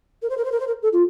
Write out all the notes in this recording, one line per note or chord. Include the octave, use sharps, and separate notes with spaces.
A#4
C5
A#4
C5
A#4
C5
A#4
A4
F4